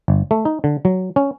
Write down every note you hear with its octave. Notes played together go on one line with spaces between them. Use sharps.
G1
A3
D#4
D3
F#3
C#4